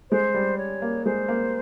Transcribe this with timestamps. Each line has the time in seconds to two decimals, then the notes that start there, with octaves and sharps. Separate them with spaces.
0.10 G#3 C5
0.34 G3
0.58 C#5
0.82 A#3
1.05 G#3 C5
1.28 A#3